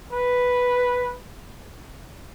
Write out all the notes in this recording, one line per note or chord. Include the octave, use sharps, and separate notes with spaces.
B4